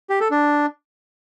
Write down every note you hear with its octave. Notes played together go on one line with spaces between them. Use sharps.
G4
A4
D4